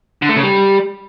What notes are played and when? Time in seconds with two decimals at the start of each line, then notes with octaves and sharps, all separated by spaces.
0.22 D3
0.29 A3
0.36 C#3
0.43 G3